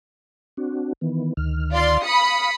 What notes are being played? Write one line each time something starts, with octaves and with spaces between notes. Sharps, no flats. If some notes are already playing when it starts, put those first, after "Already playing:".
C4 D4 F#4
D#3 E3 B3
D2 D#3 F6
F4 D5 C6
F5 B5 D#6 C#7